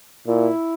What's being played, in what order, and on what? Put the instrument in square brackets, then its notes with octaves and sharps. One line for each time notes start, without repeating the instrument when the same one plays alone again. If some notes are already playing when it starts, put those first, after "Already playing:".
[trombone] A#2 [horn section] E4